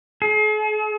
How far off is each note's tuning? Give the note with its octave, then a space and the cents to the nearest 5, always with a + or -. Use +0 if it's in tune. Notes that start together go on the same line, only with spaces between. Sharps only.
G#4 +45